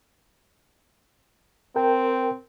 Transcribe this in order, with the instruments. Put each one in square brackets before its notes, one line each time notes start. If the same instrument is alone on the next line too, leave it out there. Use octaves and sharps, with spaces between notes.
[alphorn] C4 [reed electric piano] A#4 G5